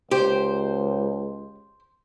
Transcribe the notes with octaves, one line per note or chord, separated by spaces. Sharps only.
C#2 G4 C5